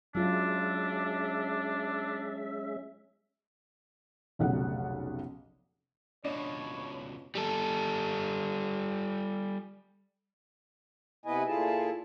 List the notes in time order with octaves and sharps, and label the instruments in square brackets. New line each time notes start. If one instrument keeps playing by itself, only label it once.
[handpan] F#3 F4 [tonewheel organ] G#3 C#4 E5 [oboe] D4
[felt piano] F1 B1 C#3 F#5
[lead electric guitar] C#2 B2 [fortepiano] D4 D#5 [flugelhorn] C#5
[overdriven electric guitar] G3 A4
[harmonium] C3 B3 E4 B4 D#5 G#5
A#2 A3 E4 F4 G#4 A5